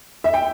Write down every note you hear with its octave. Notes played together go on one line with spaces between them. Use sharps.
E5
G5